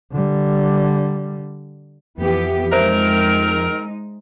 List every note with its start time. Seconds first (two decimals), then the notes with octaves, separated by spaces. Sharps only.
0.12 D3 G3
2.18 F2 E3 B3 G4
2.72 D#3 G#3 C4 D#4 A#4 C5 E5 A#5